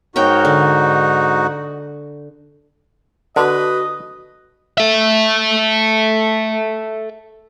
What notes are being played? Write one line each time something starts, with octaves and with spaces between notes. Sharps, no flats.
G#2 D#4 F#4 A#4 C#5 G5
D3
D3 F#4 B4 D#5
A4 E5